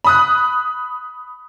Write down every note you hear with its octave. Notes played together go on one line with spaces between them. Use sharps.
B5 D#6 F#6